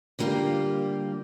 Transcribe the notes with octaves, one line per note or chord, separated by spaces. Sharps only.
D3 G3 A#3 F4 G4